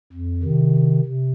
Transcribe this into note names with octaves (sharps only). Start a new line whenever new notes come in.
F2
C3 D#3
C3